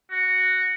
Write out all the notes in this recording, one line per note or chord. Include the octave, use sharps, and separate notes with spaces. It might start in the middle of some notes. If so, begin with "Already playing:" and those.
F#4